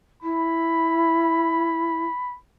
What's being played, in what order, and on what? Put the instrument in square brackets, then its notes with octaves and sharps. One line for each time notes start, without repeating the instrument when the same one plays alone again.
[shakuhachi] E4 [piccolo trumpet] B5